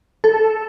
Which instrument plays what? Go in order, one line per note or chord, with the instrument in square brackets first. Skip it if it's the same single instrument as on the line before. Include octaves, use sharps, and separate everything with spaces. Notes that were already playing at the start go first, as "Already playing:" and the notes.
[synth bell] A4